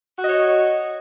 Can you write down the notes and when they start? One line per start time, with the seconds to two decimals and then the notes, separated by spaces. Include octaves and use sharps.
0.19 F#4
0.22 D#5
0.26 C#5